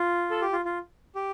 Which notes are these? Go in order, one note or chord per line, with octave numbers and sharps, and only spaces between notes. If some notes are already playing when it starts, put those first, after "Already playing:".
Already playing: F4
A4
G4
F4
F4
G4